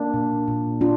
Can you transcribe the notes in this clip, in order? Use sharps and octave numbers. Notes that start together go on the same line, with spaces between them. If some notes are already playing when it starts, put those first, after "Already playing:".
Already playing: A#3 D4
A#2
A#2
A#2 D4 F4